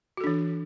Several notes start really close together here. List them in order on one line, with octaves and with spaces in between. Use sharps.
F#4 A4 D4 E3